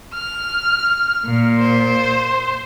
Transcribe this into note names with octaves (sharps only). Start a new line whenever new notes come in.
F6
A#2
C5